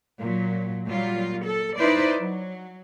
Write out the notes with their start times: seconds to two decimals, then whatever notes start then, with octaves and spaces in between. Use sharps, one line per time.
0.21 A#2 F#3
0.85 A#2 F#3 G3 F4
1.44 A4
1.77 D#4 E4 B4 C5 D5
2.18 F#3